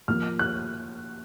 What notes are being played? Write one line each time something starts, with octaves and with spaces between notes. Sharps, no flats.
A#2 F3 A#3 F6
F#6